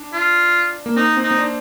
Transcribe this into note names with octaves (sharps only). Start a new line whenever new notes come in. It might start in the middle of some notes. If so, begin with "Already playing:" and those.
Already playing: D4
F4
A#3
C4 D#4
C4
D#4
C4
D4